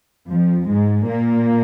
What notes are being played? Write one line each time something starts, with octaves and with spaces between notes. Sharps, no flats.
F2 F3
G#2 G#3
A#2 A#3